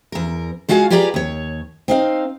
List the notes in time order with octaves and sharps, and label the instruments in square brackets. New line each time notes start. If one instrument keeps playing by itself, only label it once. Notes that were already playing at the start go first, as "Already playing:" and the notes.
[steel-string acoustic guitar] E2 A#4
G#3 F4 F#4 F5 G#5
F4 G4 G#4 B4 D5 A#5
D#2 C#5
C4 D#4 F5